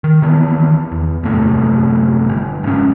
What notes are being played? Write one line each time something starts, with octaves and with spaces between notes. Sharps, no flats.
D#3
D#3 E3 B3
E2
F#2 A2 C3 A3
G1
F#1 G#2 C#4